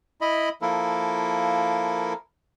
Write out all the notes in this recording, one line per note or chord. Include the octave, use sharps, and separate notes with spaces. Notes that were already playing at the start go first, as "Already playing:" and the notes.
E4 D#5 B5
F3 A#3 E4 A4 A#4